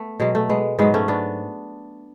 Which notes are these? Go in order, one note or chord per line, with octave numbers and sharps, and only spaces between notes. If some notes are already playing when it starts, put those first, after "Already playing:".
Already playing: A3 B3
B2 F#3 G#3
A3
G#3 B3
G#2 F#3 G#3 B3
A3 C#4
B3 D4